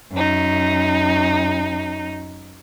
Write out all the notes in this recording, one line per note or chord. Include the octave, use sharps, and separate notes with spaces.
F#2 D#4